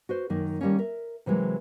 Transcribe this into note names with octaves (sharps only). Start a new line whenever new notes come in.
F#4 B4 C5
F#2 D#3 A#3
D#3 G3 A#3 C#4
A#4 E5
C3 E3 F#3 G#3 A#3